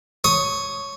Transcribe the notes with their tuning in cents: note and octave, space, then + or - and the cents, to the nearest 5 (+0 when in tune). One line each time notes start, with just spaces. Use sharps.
C#5 +0 D#6 +15